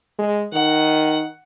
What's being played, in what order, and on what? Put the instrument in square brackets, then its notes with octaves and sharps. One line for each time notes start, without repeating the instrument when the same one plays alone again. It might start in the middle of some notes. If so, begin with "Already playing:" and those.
[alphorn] G#3
[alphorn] D#3 [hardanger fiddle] F#5